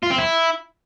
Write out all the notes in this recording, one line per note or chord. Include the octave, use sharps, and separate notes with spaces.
F4
C4
E4